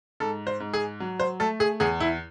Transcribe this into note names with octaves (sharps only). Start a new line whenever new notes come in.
G#2 A4
C5
G#2
G#4
F#3
C5
A3 A4
G#4
E2 G#4
E4